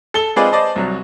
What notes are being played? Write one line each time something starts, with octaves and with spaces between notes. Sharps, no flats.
A4 G7
G#3 C4 F4 G#4 B4 D5
C5 D5 D#5 A5
C2 F#3